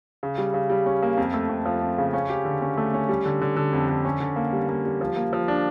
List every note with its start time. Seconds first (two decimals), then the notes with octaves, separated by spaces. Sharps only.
0.23 C#3
0.38 G3
0.54 C#3
0.70 G3
0.86 C#4
1.03 A#3
1.17 F2
1.34 A3
1.49 F2
1.65 F3
1.82 F2
1.98 C#3
2.13 C#4
2.30 G4
2.45 D3
2.62 C#4
2.77 A3
2.94 C#4
3.09 G3
3.25 D3
3.41 D3
3.56 D3
3.73 F2
3.89 D3
4.05 C#4
4.20 D3
4.36 A#3
4.53 G3
4.69 A#3
4.85 G3
5.01 F3
5.16 A#3
5.33 F3
5.48 D4